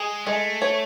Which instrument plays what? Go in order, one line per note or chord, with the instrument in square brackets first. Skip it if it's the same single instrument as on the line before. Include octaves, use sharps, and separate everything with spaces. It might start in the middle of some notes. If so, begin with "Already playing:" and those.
Already playing: [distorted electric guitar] G#3 [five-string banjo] G#4
[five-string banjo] G#3 [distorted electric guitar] A3
[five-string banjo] C#5